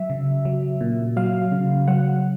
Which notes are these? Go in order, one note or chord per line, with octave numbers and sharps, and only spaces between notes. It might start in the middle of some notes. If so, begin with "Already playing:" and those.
Already playing: F#3 E5
C#3
F#3
A#2
F#3 F5
C#3
F#3 F#5